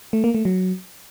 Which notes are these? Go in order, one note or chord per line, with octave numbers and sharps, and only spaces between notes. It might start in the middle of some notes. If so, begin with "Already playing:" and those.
A3
A#3
A3
F#3